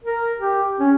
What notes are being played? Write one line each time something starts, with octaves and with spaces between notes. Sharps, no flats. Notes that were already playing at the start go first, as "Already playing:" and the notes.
A#4
G4
C#4